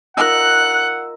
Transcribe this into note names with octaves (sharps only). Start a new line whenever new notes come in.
D#4 F4 A#4 F#5 E6 F#6